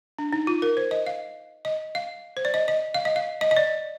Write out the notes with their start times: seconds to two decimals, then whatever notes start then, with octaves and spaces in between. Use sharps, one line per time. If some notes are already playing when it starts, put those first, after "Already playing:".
0.18 D4
0.33 D#4
0.47 F4
0.62 A#4
0.77 C5
0.91 D#5
1.07 F5
1.65 D#5
1.95 F5
2.37 C5
2.45 D5
2.54 D#5
2.68 D#5
2.94 F5
3.05 D#5
3.16 F5
3.41 D#5
3.51 D#5
3.57 D5